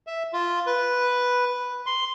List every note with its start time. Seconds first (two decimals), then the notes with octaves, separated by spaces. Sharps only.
0.07 E5
0.33 F4
0.67 B4
1.86 C6